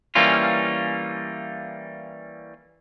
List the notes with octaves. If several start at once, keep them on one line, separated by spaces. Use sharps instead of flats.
E3 G3 A#3 C#4 F4